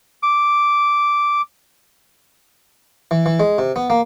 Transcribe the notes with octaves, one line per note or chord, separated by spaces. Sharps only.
D6
E3
E3
G#3
C3
B3
A#3